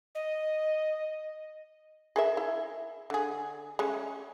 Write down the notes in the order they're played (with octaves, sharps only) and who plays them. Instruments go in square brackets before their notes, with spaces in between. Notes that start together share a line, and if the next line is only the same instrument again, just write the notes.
[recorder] D#5
[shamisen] G#4 A#4 E5
E4
D3 G#4
G#3 A3 C#4